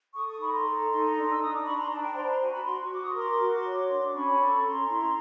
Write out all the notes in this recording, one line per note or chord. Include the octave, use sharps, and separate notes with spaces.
A4 C#6 D#6
C#6 D#6
D#4 B5 C#6
A#5 C6
A4
D#4
D4
E6
D4 D#6
D6
D4 B5 C#6
A#5 C6
D4 A5 B5
G5 A5
C5 A#5 C6
B5
A#5 C6
F#4 G#5 A#5
A5 B5
F#4 A#5 C6
C6
C#6
F#4 D6
C#6 D#6
A#4 C6 D6
F#4
C#5
D4
C#4 B5 C#6
A4
C#4 A#5 C6
E4